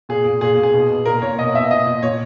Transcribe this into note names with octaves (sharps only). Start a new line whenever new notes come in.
A#2 G#4
A#2
A#2 G#4
A#2
G#4
B2
B2
A#2 A#4
A#2 C#5
B2 D#5
B2 E5
A#2 D#5
A#2
A#2 C#5